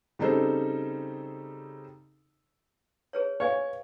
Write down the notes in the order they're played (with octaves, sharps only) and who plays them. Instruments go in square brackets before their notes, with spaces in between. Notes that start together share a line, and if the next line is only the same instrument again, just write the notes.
[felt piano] C#3 G3 C4 D#4 A4 C5
[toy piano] G#4 B4 C#5
[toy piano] B4 F5 G#5 [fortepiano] C#5